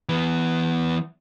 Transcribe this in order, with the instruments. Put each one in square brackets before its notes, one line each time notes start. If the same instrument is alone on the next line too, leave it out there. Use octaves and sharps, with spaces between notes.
[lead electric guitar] E3 B3